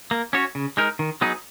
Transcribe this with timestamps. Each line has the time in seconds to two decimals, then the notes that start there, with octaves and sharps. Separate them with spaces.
0.11 A#3
0.33 C#4 F#4 C#5
0.55 C#3
0.77 G#3 D#4 A#4
0.99 D#3
1.21 F#3 B3 D#4 G#4